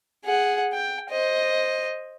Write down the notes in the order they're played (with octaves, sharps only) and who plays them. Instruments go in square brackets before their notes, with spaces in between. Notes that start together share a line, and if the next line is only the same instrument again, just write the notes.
[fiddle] G#4 F#5
G5
C5 D#5